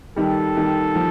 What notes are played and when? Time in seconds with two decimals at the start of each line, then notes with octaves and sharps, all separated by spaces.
0.16 D#3 G3 A4
0.57 D#3 G3
0.95 F3